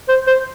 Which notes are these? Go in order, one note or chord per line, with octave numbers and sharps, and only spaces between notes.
C5
C5